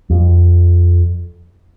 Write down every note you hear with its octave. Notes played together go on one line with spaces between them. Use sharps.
F2